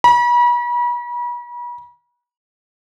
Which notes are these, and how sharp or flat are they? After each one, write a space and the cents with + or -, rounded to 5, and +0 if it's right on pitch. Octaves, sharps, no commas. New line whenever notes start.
B5 -40